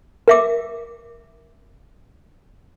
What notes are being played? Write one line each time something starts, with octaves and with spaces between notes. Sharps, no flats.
A#4 E5 D6